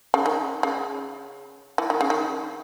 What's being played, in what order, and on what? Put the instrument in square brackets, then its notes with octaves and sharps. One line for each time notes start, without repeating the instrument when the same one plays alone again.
[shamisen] C#3
D#3
C#3
E3
D#3
C#3
D#3